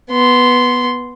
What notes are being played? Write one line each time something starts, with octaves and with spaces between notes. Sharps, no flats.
B3 C6